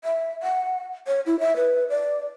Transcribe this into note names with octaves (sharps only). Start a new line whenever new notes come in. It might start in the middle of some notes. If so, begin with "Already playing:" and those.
E5
F#5
C#5
E4
E5
B4
D5